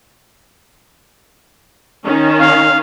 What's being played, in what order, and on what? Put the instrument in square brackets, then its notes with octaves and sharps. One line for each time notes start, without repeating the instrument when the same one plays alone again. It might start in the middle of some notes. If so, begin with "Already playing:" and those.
[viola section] D#3 C#4
[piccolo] F5